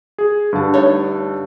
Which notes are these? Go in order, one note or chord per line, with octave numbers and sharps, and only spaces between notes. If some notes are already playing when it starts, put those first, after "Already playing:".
G#4
G2 D3 A5
A3 D#4 C#5